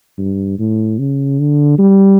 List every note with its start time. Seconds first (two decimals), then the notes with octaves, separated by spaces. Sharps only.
0.18 G2
0.59 A2
0.99 C#3
1.40 D3
1.79 G3